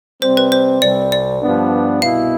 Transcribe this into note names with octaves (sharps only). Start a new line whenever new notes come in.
C3 G3 C4 C5
B4
C5
C2 C3 G3 C4 D5
D5
G2 F3 B3 D4
C2 B2 B3 E4 F5